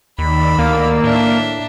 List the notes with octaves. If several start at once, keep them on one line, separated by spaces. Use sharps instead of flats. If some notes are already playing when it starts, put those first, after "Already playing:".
D#2 D#3 D5 B5 E6
D2 A#3
A2 D4 E5